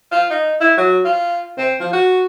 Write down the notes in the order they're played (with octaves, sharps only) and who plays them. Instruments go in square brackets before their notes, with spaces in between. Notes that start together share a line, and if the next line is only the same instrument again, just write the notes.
[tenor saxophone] F4
D#4
E4
F#3
F4
C4
F3
F#4